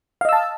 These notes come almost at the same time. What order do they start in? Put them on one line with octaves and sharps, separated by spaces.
F5 D#5 E6 A5